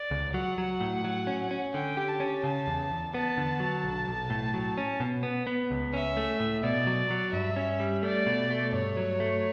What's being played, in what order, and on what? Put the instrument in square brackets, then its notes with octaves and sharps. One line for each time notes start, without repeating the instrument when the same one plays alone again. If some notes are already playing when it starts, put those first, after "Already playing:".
Already playing: [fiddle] D5
[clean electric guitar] C#2
[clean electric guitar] F#3 [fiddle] F#5
[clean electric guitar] F#3
A2
F#3
C#4
C#4
[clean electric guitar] D3 [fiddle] G5
[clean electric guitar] G4
[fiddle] A5
[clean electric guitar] C#4
[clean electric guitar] C#3 [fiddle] A5
[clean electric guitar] E2
E2
[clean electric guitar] B3 [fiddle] A5
[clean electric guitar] D3
F#3
B1
B1
A2
F#3
C#4
B2
B3
B3
C#2
[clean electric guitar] C#4 [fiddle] E5
[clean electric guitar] A3
A2
[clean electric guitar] B2 [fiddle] D5
[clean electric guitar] F#3
F#3
[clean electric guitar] G2 [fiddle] E5
[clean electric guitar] C#4
G3
[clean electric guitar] A3 [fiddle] D5
[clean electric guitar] B2
A3
[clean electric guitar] G2 [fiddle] C#5
[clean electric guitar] F#3
A3